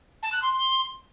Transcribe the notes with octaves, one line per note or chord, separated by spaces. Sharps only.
A5
F#6
C6